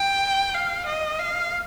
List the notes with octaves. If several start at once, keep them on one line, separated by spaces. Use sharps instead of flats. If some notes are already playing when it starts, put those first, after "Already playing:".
Already playing: G5
F5
D#5
F5